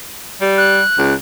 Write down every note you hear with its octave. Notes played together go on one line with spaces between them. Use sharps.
G3
F#6
C#2